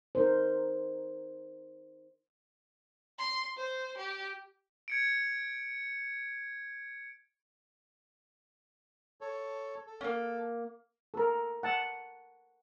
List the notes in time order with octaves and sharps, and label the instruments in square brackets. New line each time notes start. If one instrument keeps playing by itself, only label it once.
[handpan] D#4 A#4 C5
[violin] C6
C5
G4
[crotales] G#6 C#7 D7
[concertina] A4 C#5
A4
[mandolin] A#3 C#4
[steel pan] A4 A#4
F#5 A5